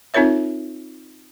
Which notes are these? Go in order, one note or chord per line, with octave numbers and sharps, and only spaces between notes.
C4 D#4 F4 A#4 C#5 E5